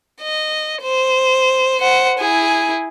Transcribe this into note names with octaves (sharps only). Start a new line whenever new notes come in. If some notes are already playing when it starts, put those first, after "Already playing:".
D#5
C5
C5 F#5
E4 G#4